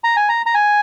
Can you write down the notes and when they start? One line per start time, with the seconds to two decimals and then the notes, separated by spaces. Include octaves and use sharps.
0.04 A#5
0.17 G#5
0.29 A#5
0.46 A#5
0.54 G#5